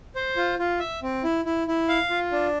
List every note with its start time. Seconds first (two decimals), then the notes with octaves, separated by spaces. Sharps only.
0.16 C5
0.37 F4
0.59 F4
0.80 E5
1.02 C4
1.24 E4
1.45 E4
1.67 E4
1.89 F5
2.10 F4
2.32 D4